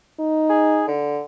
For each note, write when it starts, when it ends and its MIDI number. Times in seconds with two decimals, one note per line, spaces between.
0.20 0.93 63
0.49 0.85 68
0.87 1.22 50